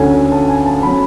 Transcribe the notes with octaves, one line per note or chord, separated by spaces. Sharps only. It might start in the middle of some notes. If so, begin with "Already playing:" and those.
Already playing: D2 D3 A3 C#4 G#5
A5
G#5
A5
F#3 C#4 B5